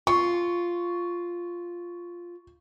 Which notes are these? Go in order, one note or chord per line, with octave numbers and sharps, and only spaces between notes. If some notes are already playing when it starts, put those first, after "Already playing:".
F4 C#6